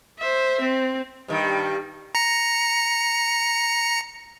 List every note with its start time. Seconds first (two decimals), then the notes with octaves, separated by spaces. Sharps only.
0.19 C5 E5
0.61 C4
1.28 G2 D#3 G3
2.15 A#5 C#7